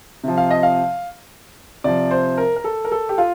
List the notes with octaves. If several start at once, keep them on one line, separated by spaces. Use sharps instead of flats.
C3 F3
F5
D#5
F5
C3 F3 D5
C5
A#4
A#4
A4
A#4
A4
G4
F4